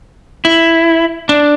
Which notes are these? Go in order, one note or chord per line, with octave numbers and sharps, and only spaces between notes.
E4
D4